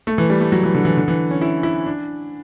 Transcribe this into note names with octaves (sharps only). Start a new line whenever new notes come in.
A3
E3
G3
A3
F#3
E3
D3
E3
D3
E3
C#4
E4
E4
D4